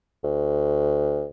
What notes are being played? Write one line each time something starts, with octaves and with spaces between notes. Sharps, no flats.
D2